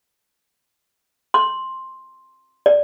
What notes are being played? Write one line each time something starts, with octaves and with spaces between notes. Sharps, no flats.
C6
D5